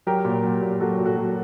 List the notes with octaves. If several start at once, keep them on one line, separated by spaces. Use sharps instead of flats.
F#3 G4 A#4
A#2
F#3
A#2
F#3 F#4 A4
A#2
F#4 A4
F#3